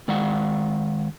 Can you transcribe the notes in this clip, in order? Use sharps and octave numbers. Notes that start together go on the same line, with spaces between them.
D#3 G#3 D5 F5 F#5